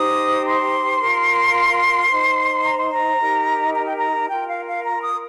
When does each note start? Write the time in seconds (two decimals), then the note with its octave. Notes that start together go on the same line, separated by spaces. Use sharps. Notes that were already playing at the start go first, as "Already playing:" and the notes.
Already playing: D#4 G4 C5 D#6
0.45 C6
1.00 F4 A#4
2.09 D#4 C5
2.64 A#5
2.78 C6
2.90 A#5
3.19 D#4 G4 A#4
3.74 A#5
3.85 G5
3.96 A#5
4.29 F4 A#4 G5
4.48 F5
4.67 F5
4.85 A#5
5.03 D#6